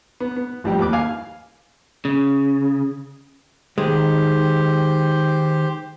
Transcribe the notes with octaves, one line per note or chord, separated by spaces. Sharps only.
B3
B3
A1 F2 G3 G4
D#2 B4 D6
F5 G#5
C#3
D#3 G#3 G4 C5